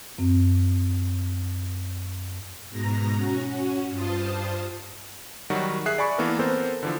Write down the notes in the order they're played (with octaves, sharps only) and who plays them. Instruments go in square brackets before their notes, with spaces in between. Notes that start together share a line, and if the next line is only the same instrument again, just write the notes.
[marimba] F#2 C4
[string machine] G#2 B2 A#5 A#6
C#4 F#4
G2 F4 C5 A5 D#6
[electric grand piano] D#3 F#3 G3 F#4
G#4 E5 F#6 C7
D5 G#5 B5 C#6
E3 A#3 B3 A4 A#4
B3 C4 A4 A#4 C5
D3 E3 F3